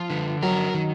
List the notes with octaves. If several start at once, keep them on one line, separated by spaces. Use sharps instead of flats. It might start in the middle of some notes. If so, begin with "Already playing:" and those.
Already playing: F3 F4
D3
F#3 A#4
D#3